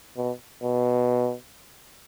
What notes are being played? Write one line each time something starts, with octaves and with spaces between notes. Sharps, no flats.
B2
B2